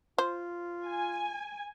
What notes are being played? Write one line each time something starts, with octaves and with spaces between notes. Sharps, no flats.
F4 C5
G#5